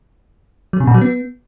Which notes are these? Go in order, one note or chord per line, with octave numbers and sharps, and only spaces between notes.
F#3
C3
A#2
F#3
B3